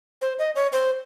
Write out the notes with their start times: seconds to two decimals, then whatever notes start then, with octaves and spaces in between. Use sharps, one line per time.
0.22 C5
0.39 D#5
0.55 C#5
0.73 C5